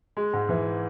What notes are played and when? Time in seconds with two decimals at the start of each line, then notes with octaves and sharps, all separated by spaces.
0.17 G#3
0.33 G#2
0.49 E3